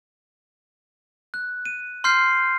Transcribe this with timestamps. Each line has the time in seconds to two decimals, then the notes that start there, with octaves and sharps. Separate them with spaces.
1.34 F#6
1.66 D#7
2.04 C6 F6 G6 C7